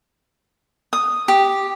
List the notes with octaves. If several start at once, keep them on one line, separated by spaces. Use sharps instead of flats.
D#6
G4